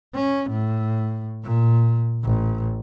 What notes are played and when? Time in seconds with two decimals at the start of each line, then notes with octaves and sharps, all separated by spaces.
0.14 C#4
0.50 A2
1.43 A#2
2.24 A1